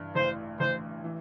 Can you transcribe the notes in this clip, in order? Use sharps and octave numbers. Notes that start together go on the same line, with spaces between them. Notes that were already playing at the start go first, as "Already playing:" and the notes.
Already playing: G2 E3
A1 C5
A1 C5
E3